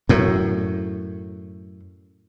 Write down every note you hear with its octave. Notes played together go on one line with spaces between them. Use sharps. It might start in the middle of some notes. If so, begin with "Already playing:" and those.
F#2 A2